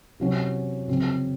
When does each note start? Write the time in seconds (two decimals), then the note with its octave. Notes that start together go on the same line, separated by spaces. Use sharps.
0.20 C3 F#3 C#4
0.88 C#3 F#3 C4